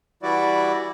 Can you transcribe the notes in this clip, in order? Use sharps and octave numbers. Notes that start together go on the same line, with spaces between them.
E3 G3 E4 F#4 D5